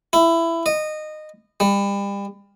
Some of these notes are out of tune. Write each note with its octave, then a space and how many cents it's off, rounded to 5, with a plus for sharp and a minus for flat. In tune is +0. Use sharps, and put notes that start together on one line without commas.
E4 +15
D#5 -20
G3 +35